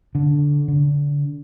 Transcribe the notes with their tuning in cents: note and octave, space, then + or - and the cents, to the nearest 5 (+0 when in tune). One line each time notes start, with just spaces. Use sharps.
D3 -15
D3 -30